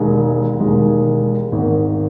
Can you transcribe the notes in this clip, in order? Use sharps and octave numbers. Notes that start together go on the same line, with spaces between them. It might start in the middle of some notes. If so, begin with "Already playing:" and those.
Already playing: E1 D#2 D#3 G#3
E1 D#2 D#3 G#3
G#1 G#2 D#3